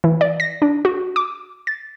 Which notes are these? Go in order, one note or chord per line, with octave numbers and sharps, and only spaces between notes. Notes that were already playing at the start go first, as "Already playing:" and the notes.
E3
D5
A#6
D4
F#4
D6
A6